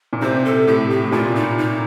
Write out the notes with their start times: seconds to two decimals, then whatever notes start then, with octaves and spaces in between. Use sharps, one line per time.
0.13 A#2
0.22 C3 C5
0.45 A4
0.67 A2 G4
0.90 G4
1.04 A2
1.12 A#2 F4
1.36 D#4
1.58 D#4